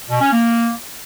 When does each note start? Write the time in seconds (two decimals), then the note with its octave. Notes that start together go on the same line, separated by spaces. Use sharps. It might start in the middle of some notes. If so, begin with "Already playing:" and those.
0.10 B2
0.21 C#4
0.32 A#3